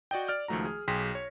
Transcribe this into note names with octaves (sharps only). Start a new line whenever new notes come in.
F#4 D5 D#5 G5
D5 F6
C#2 D#3 F3 A3 F#4 A#5
G#4
B1 G#4 G5 C6 A#6 B6
C#5